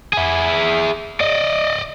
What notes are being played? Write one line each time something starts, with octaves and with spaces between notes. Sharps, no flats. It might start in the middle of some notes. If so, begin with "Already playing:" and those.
E4 G#4
D5 D#5